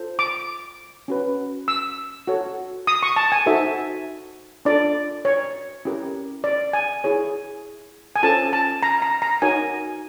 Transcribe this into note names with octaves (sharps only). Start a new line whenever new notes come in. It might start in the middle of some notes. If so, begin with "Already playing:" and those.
Already playing: F4 A4 C5
D6
C#4 F#4 B4
E6
F#4 A4 C#5
D#6
C#6
A5
G#5
D#4 F#4 A4 C5 E5
D4 F4 A4 D5
C#5
C#4 E4 G4 A#4
D5
G#5
E4 G#4 C#5
G#5
C#4 F4 A4 C5 A5
A5
A#5
A#5
A#5
D#4 F#4 A#4 C#5 G#5